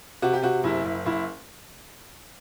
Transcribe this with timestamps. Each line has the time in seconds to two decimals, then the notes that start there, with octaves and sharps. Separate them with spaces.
0.22 C3 F#4
0.33 G4
0.43 C3 F#4
0.64 F#1 E4
0.85 F#1
1.06 F#1 E4